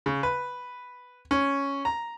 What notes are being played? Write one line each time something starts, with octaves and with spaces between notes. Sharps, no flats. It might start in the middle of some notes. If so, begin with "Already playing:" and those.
C#3
B4
C#4
A#5